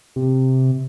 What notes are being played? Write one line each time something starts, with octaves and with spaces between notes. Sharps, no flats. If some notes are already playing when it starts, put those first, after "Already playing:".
C3